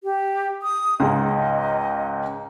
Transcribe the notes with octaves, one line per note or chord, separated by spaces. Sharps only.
G4
D#6
C#2 G#2 D#5